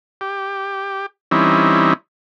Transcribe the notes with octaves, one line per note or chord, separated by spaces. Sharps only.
G4
E3 G3 C4 C#4 D#4 E4